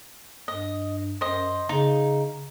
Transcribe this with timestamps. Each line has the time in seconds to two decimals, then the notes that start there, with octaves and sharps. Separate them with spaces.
0.48 G2 D#5
1.21 F#2 C5 D#5
1.69 C#3 D#4